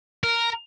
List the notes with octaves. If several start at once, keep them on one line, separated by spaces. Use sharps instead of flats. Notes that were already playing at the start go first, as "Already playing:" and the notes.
A#4